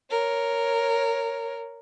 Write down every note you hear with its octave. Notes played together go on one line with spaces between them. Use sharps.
A#4 C#5